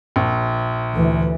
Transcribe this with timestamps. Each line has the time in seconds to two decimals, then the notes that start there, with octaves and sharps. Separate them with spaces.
0.16 A#1
0.95 D2 E3